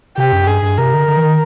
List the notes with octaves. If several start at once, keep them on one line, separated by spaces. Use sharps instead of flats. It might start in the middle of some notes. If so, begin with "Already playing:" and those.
C3 G4
F#2
G2 G#4
G2
C3 A#4
D3
D3
E3
D#3